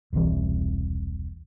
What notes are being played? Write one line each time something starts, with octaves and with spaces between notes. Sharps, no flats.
E1 C2 C3 E3